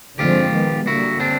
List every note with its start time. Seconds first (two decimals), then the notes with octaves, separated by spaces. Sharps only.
0.19 D3 F3 G#3 C4 F4 G4
0.53 D#3 G#3 B3
0.87 D3 G3 A#3 E4 F#4
1.20 C4 D4